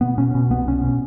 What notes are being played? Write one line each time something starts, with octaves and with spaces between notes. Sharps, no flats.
B2 B3
B2 C#4
B2
C2 B3
C2 C#4
B2